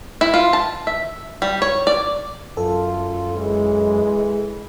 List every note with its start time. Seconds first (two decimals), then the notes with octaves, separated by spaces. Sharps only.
0.21 E4
0.34 F4
0.53 A5
0.87 E5
1.42 G3
1.62 C#5
1.87 D5
2.57 F#2 F4 A4
3.36 E3 G#3